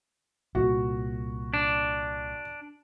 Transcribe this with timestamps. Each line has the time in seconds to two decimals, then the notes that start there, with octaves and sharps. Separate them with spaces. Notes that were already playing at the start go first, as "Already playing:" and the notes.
0.55 C2 A#2 F#4
1.54 D4